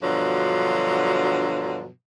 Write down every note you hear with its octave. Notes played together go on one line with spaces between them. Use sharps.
G2 B2 D3 F3 F#3